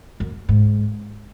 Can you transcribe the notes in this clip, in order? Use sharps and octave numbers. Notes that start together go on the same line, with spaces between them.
F#2
G#2